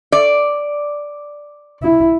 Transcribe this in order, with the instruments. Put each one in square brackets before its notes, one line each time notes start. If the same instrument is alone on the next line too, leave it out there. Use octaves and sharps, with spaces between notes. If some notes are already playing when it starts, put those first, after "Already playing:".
[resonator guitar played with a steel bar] D5
[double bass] E4